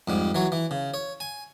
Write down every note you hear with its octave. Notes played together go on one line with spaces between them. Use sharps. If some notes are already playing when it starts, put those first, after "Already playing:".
F2 G#2 G3
E3 F#3 C#5
E3
C#3
C#5
G#5